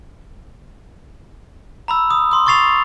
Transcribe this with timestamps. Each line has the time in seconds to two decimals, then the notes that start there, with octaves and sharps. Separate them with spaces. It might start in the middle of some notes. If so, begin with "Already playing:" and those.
1.88 A#5 B5 E6
2.11 D#6
2.31 C6 D#6
2.46 C#6 D#6 A6 C7 F7